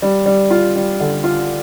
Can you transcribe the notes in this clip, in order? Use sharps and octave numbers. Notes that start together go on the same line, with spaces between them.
G3
G3
F4
G3
D3
F4